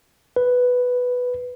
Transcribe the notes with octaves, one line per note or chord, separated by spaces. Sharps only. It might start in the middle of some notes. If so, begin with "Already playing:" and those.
B4